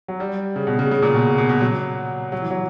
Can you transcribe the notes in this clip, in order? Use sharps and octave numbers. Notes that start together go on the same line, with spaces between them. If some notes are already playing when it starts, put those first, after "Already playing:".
F#3
G3
C#3
B2
C#3
C#3
A#2
B2
B2
B2
F#3
F#3
E3
F#3